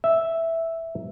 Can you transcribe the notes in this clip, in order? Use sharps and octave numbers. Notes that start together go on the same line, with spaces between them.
E5